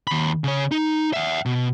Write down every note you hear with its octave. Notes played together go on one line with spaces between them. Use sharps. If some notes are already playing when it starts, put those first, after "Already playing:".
D#2 B5
C#3 C#5
D#4
E5 F#5
B2